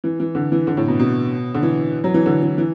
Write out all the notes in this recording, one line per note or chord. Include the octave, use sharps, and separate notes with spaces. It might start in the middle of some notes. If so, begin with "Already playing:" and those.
E3
E3
D3
E3
D3
A2
B2
B2
D3
E3
F#3
E3
D3
E3
E3